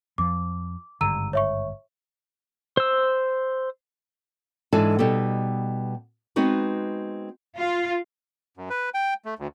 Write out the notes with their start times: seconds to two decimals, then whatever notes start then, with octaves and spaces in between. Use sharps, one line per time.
0.18 F2 F3 D6
1.01 G#1 G2 D3 A#5 E6 D#7
1.33 C#5 E5 C#6
2.77 C5 E6
4.73 G#2 E3 D4 E4 A4 G#5
4.99 B2 G3 B3 D#4 G4 A4
6.36 G#3 B3 C4 D#4 F#4 B4
7.56 F4
8.57 F#2
8.70 B4
8.94 G5
9.25 A3
9.39 D2